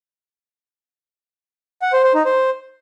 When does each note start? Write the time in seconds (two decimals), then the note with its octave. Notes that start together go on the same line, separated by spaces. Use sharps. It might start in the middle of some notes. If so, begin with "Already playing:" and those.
1.82 F#5
1.93 C5
2.04 C5
2.14 D#4
2.25 C5